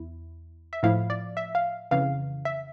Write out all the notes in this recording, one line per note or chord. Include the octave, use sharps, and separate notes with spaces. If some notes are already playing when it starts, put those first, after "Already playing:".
Already playing: E2 E4
E5
A2 F3 A3 E4 F5
D5
E5
F5
F2 C#3 E3 F5
E5